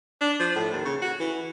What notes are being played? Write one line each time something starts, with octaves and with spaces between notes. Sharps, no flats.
D4
F3
A2
D#2
C#3
F#4
E3